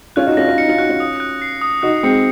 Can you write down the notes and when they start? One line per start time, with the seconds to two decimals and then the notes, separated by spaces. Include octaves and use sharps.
0.16 C#4 F4 F#6
0.26 D#4 F#4
0.37 C#4 F4 A#6
0.48 C#4 F4
0.58 D#4 C#7
0.68 C#4 F4
0.78 D#4 F#4 F#6
0.89 C#4 F4
1.00 D#6
1.20 F#6
1.42 C7
1.61 D#6
1.82 D#4 F#4 F#6
2.03 G#3 C4 C#7